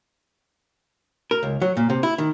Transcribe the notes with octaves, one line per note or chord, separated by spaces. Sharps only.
A#4
C#2
F#3
A#2
C3
E4
D#3